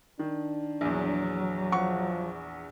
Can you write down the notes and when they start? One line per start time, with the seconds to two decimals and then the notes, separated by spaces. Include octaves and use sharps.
0.19 D#3 D4
0.81 A#1 E2 F#3
1.72 F3 F#5 C#6